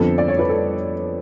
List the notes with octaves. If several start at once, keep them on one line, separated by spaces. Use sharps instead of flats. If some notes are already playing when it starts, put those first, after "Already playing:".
Already playing: F2 D3 F3 B3 A4
D5
C#5
B4
A4